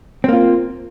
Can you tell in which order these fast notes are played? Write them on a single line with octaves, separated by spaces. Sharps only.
C4 A#3 F4